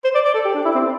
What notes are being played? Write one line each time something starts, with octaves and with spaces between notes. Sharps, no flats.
C5
D5
D5
A4
G4
D4
E4
C4